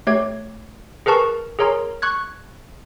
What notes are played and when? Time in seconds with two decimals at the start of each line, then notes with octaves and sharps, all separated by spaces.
0.07 A3 G4 C#5 G#6
1.06 G#4 A#4 B4 A5 C#6
1.59 G#4 A#4 C#5 A#5 C6
2.02 C#6 F#6 G#6